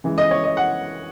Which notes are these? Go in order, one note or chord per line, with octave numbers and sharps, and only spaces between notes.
C#3 E3 G#3
D#5
C#5
D#5
F#5